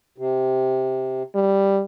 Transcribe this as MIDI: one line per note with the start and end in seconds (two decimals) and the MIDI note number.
0.18 1.23 48
1.35 1.82 55